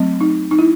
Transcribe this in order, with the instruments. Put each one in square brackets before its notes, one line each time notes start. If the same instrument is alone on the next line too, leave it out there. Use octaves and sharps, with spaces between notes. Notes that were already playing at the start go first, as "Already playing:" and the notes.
Already playing: [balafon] F#3 A3 C4
D#4
D#4
E4